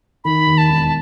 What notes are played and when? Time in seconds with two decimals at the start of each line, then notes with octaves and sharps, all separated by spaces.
0.24 D#3 B5
0.47 D#2
0.58 A5
0.69 E1